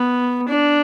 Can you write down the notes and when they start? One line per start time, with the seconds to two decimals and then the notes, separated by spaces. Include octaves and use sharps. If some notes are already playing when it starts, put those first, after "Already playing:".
Already playing: B3
0.49 D4